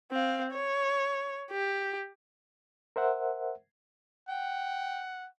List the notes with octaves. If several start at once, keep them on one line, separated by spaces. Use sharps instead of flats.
C4 F5
C#5
G4
A#4 C5 E5 F#5
F#5 G5